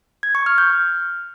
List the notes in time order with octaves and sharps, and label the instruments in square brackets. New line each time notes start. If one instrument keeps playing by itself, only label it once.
[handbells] G#6
C#6
F6
G6
F6